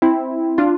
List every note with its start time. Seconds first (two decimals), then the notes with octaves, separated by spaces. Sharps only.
0.02 C4 E4
0.58 D4 F4